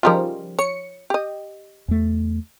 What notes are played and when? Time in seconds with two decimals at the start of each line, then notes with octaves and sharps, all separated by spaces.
0.03 C#3 F3 G3 D#4 F4 A#4
0.59 C#5 C#7
1.10 G4 D#5
1.88 E2 A3